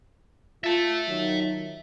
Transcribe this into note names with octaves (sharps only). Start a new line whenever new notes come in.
F4 E5 A5
D#3 F#3